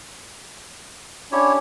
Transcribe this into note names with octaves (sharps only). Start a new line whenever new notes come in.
C#4 D4 E4 G4 C#5